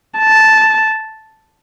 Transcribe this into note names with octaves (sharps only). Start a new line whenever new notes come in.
A5